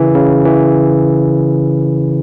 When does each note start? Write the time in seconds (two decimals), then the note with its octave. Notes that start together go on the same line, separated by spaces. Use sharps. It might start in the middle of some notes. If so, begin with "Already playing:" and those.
Already playing: C#3 E3
0.15 C#3
0.46 E3